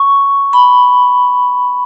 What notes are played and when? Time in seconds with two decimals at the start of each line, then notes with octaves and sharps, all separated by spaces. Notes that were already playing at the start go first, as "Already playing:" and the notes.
Already playing: C#6
0.53 B5